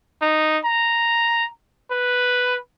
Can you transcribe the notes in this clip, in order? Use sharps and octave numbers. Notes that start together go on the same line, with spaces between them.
D#4
A#5
B4